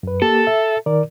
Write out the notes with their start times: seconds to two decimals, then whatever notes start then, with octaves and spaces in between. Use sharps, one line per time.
0.03 F#2 B4
0.22 A#3 G4 A4
0.47 E5
0.86 D#3 A#4 D5